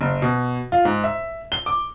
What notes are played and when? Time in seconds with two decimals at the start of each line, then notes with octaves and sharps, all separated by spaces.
0.01 F#1
0.22 B2
0.72 F4
0.85 G#2
1.04 E5
1.52 G7
1.66 D6